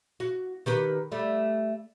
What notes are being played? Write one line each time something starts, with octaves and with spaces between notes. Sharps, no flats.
F#4
D#3 G4 B4
G3 A3